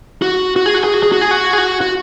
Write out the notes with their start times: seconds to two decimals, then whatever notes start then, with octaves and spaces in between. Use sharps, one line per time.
0.22 F#4
0.56 F#4
0.66 G#4
0.75 F#4
0.84 G#4
0.94 F#4
1.03 G#4
1.12 F#4
1.21 G#4
1.31 F#4
1.53 G#4
1.58 F#4
1.81 F#4